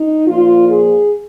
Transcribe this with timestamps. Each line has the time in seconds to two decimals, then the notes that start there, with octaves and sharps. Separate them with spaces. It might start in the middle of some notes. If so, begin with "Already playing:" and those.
Already playing: D#4
0.26 A#2 F3 F4
0.67 G#4